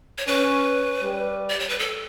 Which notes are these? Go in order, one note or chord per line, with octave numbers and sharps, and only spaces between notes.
C#5
C#4 B4
G3
D5
C#5
B4
A4